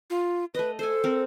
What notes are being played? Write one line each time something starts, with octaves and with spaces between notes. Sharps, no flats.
F4
A3 B4 D#5
A4 C5 G#5
C4 A#4